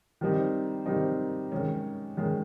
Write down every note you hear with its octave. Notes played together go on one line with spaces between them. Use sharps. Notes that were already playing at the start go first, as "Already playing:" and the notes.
D#3 G3 C4 D#4
D#3 G3 C4 D#4
D#3 G#3 C#4
D#3 G#3 C#4